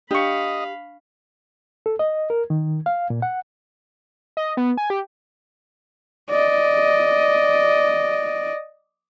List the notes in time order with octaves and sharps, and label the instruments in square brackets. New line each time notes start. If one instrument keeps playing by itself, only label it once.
[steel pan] D4 C#6 [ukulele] G4 [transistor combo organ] D#5 [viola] F5 B5
[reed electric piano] A4
D#5
A#4
D#3
F5
A#2
F#5
[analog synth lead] D#5
B3
G#5
G4
[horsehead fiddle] D5 D#5